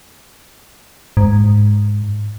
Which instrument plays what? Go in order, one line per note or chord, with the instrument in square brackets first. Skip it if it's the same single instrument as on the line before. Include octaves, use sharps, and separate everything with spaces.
[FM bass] G#2